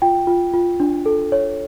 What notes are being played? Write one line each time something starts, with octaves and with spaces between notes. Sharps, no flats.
F4 G5
F4
F4
D4
A4
C#5